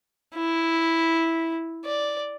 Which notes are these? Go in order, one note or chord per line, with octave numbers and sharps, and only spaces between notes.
E4
D5